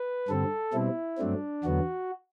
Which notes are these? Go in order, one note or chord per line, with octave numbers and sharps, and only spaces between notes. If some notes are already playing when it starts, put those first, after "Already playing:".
Already playing: B4
G2 D3 G3 C4 A4
B2 G3 C4 E4
G2 F#3 A3 C4 D4
E2 D3 F#3 B3 F#4